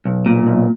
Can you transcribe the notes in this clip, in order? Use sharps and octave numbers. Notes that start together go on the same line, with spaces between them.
B1
A#2
B1